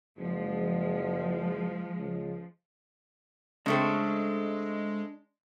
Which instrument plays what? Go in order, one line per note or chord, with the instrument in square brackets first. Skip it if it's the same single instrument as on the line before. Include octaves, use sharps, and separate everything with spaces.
[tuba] F#1 [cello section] F3 G#3
[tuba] C#2
[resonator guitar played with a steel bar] C#3 A3 C4 [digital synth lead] G#3 [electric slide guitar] D4